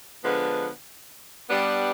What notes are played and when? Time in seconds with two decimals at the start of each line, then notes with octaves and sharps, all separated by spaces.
0.23 D3 F3 G#3 B3
1.50 G3 B3 D4